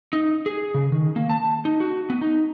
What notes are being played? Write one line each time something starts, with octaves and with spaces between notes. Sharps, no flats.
D#4
G#4
C#3
D#3
A#3
A5
D#4
F#4
B3
D#4